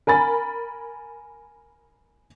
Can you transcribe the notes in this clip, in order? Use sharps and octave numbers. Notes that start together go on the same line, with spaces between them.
A#4 G#5 B5 A6